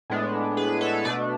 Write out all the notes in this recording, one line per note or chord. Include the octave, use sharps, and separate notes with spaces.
A2 G#3 B3 D4
G#4 B4
A4 C#5
B2 A3 D4 B4 D5